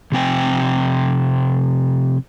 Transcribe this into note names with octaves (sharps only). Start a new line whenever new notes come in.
C3 F3 C4 G5 G#5